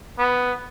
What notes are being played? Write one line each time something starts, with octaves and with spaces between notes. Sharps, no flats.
B3